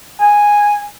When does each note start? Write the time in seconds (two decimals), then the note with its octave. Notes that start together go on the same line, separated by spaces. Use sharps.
0.20 G#5